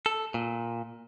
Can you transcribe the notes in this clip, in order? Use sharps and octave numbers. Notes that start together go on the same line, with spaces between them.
A4
A#2